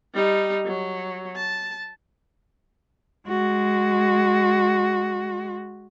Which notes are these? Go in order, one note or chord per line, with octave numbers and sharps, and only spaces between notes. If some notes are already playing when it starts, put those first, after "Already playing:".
G3 D#4
F#3
A5
G#3 F#4